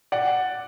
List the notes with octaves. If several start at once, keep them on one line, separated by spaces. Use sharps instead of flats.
D5 F#5